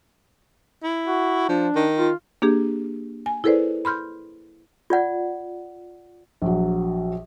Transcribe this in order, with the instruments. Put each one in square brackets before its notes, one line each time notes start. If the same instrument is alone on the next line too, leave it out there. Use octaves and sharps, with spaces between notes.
[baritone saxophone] E4
[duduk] F#4
[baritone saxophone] F3 [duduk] D4
[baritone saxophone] D#3
[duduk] F4
[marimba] A#3 D4 G4 G#4
G#5
E4 G#4 A4 B4 C5 D5
B5 C6 F6 G6
[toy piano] F4 D5 F#5
[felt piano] A#1 F#3